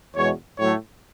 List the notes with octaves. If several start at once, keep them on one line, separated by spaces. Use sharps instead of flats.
E2 B2 G#3 C#5
A2 F#3 A3 C#5